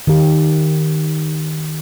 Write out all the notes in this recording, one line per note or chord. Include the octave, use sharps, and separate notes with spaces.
D#3 G4